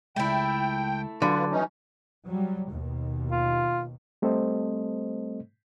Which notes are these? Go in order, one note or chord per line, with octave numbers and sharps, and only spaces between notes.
C#2 F#2 G#3 A3 E4 G5
D3 F#3 F4 F#4 B4 G#5
E3 C#4 D#4
F#3 G3
D#2 B2
F4
G3 A3 C4 A4 C5 D#5